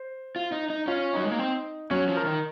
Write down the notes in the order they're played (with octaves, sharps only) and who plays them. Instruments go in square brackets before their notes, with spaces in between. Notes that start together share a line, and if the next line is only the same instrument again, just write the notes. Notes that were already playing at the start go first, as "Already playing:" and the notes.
Already playing: [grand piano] C5
[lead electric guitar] F4
D#4
D#4
[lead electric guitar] C#4 [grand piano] F4
[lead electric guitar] F#3 [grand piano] D#4
[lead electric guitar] G#3
A#3
C4
[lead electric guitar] F#3 [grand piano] C#4
[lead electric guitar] F3
[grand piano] A#4
[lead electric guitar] D#3